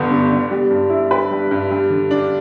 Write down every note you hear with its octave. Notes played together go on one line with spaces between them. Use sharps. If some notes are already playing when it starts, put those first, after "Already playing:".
Already playing: G1 G2 D3 B3
G2
G1
G3
G2
E4
B4
G3
G2
G3
D3
D4